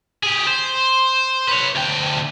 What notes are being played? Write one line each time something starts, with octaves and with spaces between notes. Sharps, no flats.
G4 G#4
C5
B4 C#5
D2 G5